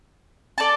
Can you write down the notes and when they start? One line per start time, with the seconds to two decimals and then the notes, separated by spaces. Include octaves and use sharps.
0.58 A4 D5 A5